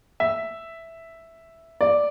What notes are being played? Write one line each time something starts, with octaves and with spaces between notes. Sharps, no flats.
E5
D5